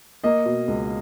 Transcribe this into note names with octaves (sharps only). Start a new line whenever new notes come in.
A#3 D#5
B2
C#2